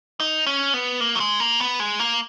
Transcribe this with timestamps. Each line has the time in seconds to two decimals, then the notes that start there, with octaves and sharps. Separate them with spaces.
0.20 D#4
0.46 C#4
0.74 B3
1.00 A#3
1.15 F#3
1.20 G#3
1.40 A#3
1.60 B3
1.80 G#3
2.00 A#3